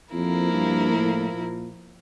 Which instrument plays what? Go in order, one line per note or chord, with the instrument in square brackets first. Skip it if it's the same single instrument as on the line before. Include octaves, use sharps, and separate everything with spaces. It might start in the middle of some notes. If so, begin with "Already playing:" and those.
[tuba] F2 [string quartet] F3 A#3 E4 A#4
[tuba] G2
A2
A#2